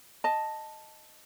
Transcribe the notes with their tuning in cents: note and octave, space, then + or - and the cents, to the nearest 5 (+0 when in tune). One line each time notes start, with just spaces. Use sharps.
D#5 +0 A5 +0